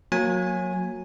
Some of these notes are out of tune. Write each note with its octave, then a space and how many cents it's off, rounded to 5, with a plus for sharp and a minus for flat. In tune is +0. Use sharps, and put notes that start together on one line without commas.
F#3 -20 A#3 +0 G#5 +0